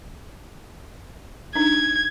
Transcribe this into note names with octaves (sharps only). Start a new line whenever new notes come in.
D4 D#4 G#6